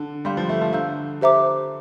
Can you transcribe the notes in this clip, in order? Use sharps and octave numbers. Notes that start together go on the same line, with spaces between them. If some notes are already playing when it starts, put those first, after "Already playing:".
Already playing: D3
G3 F5 C6 G6
F3
A3
F3
D3 F5 A#5 E6 G6
G4 C5 E5 A#5 D6